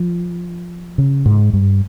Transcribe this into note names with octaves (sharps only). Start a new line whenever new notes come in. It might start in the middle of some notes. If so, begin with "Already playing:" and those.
Already playing: F3
C#3
G#2
G2